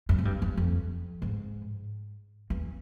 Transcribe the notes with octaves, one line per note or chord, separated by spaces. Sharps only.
F#2
G#2
G2
F2
F2
G#2
E2